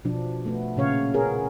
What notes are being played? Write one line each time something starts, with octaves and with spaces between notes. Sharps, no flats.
B2 F3 D4
A3 B3
A#2 C#3 C#5 F5
B3 C#4 G#4 A#4